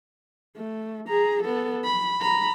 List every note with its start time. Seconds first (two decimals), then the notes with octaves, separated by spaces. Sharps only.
0.56 A3
1.08 G#4 A#5
1.43 B3 A4
1.84 B5
2.21 A#5 B5